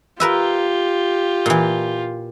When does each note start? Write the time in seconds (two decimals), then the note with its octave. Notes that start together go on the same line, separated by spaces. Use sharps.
0.20 F4 G4 A#4 B4 E5
1.46 A#2 E3